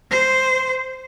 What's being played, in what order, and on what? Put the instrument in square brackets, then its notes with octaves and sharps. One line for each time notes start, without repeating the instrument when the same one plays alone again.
[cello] C5